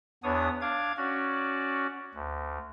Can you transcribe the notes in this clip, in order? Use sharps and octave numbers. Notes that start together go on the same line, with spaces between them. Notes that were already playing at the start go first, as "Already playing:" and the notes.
E2 B3 D4 C#5 D#6
D4 F5 D6 G#6
C#4 F#4 D5
D2